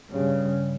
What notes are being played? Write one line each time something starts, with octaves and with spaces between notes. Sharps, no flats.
G2 C#3